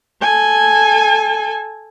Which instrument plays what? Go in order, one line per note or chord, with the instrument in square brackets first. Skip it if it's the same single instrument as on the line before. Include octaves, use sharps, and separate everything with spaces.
[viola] A4 G#5